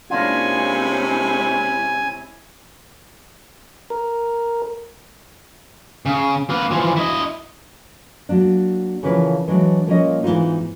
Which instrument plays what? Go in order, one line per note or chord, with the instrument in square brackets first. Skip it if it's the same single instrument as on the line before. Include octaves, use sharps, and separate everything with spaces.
[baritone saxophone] C3 [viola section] G#3 C#4 E4 [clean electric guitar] A#3 D4 F4 [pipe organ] G#5
[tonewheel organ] A#4
[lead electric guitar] C#3
A#3 B4
E3 F3
E4 D#5
[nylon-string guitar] F#3 A#3 D4
C#3 E3 F3 A#4 B4
E3 F#3 G#3 D4
A#2 F3 G3 A#3 C#4 D#5
G#2 E3 G#3 B3 D#4 F4